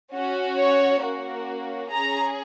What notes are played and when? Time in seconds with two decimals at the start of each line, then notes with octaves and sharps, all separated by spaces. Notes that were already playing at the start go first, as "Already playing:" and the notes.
0.13 C#4 F#4
0.57 C#5
1.01 A#3 C#4 F#4
1.91 C#4 G#4 A#5